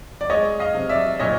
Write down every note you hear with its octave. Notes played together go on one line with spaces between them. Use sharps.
D5
G#3 C#5 D#5
D#5 F5
C3
D5 E5
A#2 C#5 D#5